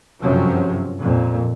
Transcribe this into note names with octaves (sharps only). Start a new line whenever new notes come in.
G1 F#2 C3 F3 F#3
F2 A#2